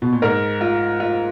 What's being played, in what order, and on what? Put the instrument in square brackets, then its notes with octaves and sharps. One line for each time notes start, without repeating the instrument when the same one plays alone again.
[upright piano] B2
A#2
[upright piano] G#2 [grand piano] A#4
[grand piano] F4
F4